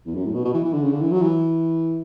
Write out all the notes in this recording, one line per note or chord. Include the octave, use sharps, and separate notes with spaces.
E2
F#2
A2
B2
B2
E3
E3
D3
C#3
D3
E3
F#3
E3